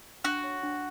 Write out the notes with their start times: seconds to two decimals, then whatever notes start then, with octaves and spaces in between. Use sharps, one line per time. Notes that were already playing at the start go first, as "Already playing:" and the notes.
0.24 D4 F#4
0.44 C#5
0.63 D4